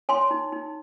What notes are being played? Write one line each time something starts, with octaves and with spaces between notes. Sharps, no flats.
C#5 G#5 C6
D#4
D#4